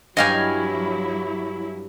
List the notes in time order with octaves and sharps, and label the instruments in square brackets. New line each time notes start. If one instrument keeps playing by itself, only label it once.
[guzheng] G2 C#5 G5 [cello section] F#3 E4 [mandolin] D#5 F5 G#5